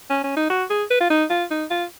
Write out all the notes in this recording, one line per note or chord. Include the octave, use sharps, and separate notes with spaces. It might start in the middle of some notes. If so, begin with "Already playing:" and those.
C#4
C#4
D#4
F#4
G#4
B4
F4
D#4
F4
D#4
F4